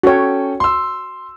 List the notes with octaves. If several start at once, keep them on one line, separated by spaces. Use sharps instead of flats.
C#4 F#4 A4 C#5 G5
C6 E6